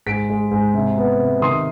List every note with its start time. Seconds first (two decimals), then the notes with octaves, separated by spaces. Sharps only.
0.06 G#2 B6 D7
0.30 G#3
0.51 G#2
0.74 C3
0.98 B3
1.20 C3
1.42 D#3 C6 D#6